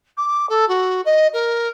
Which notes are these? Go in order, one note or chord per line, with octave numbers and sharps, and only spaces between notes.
D6
A4
F#4
D#5
A#4